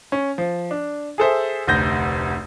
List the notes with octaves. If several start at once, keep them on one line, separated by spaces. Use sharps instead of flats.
C#4
F3
D4
G#4 A4 C5 E5
F1 D2 G6 A#6